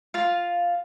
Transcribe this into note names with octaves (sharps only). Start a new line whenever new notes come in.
F4 F5